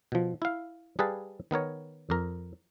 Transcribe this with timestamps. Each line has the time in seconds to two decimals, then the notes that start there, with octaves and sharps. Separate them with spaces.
0.12 B2 F3
0.42 E4 F5
0.99 G3 G#4 B4 F5 A5
1.51 D#3 B3 A#4 C#5
2.10 F2 A#4